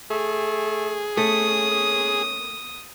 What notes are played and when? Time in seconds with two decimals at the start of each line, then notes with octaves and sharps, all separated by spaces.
0.10 A3 G#4
1.17 A3 C#4 D#6